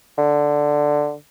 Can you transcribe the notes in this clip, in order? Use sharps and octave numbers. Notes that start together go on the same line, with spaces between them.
D3